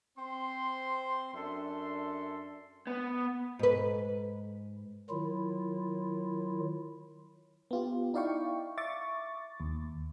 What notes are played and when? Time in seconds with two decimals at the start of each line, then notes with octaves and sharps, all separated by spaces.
0.18 C4 C6
1.33 F#2 D4 A4 E5 C6
2.87 B3
3.59 G#2 B4
5.10 D#3 F#3 E4 F4
7.71 B3 F4 G4
8.14 D#4 E4 D5 F5 G5 C#6
8.78 E5 C#6 D6 A6
9.60 D#2